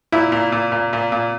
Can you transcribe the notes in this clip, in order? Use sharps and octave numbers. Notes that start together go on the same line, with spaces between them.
A#2 E4
A#2
A#2
A#2
A#2
A#2